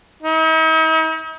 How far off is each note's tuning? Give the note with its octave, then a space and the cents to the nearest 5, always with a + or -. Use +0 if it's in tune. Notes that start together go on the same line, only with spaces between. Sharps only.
D#4 +45